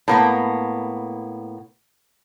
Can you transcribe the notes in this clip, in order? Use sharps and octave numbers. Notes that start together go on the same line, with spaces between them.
A2 A#3 B3